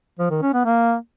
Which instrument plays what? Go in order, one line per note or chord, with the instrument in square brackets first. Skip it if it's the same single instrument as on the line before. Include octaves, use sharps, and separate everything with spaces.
[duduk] F3
D#3
C#4
B3
A#3